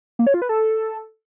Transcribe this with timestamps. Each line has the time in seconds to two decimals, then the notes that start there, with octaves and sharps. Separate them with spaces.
0.19 A#3
0.27 C#5
0.34 F4
0.42 B4
0.49 A4